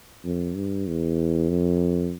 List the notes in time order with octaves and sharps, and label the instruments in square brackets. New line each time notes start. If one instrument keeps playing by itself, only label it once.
[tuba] F2
G2
E2
F2